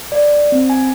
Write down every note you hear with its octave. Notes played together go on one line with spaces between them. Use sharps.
D5
C4
G#5